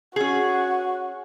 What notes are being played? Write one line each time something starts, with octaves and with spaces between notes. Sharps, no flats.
C#4 F#4 G#4